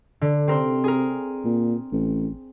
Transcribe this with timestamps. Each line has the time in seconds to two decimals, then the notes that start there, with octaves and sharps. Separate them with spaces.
0.21 D3
0.48 C3 C4 A#4 C5
0.84 G#4 A#4
1.45 A#2
1.92 A1